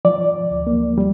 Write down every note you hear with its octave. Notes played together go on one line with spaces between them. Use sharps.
F3 D5
D2
A#3
F3 G3